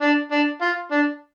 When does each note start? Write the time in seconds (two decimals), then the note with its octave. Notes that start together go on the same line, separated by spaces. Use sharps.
0.01 D4
0.31 D4
0.62 F4
0.91 D4